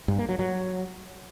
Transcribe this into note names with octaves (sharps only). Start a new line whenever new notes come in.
G2
A#3
F#3
F#3